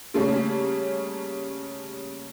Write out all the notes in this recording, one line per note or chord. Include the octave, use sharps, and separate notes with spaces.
C#3 G3 A3 A#3 C#4